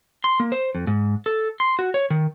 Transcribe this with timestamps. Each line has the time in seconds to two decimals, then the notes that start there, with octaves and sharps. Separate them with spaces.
0.24 C6
0.40 A#3
0.52 C5
0.75 F2
0.87 G#2
1.26 A4
1.60 C6
1.79 F#4
1.94 C#5
2.10 D#3